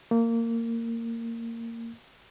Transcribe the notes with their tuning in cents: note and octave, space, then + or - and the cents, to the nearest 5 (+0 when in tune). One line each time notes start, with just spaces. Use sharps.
A#3 -20